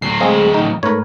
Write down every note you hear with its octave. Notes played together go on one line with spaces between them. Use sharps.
D2 F#3 C7
G#3 C4 G#4 D#5 F5
A1 D#4
G#2 A3 A#4 B4 C#5